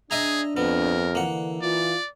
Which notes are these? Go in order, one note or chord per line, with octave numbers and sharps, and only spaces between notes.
D4 G#4 D#5 E5 A#5
F2 B3 A#4
D3 E3 A#3 F#5
E3 F4 D5